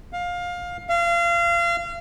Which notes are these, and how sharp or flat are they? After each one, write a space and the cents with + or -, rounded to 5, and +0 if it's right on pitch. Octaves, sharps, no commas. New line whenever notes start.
F5 +20
F5 -30